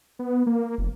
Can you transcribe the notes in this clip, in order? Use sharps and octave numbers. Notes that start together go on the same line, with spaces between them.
B3
A#3
F1